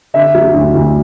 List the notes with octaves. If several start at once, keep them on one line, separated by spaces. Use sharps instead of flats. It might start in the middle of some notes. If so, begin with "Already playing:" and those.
D3 E5
F#3
D2
D2